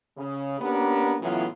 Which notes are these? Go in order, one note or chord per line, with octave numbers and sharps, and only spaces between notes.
C#3
A#3 B3 C#4 D4 G4 A#4
A2 C#3 E3 F#3 B3 F4